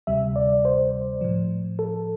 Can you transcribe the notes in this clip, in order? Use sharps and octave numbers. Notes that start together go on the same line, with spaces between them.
D2 C3 G3 E5
D5
C5
A2 F3
A4